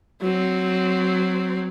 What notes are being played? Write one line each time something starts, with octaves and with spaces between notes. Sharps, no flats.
F#3 C4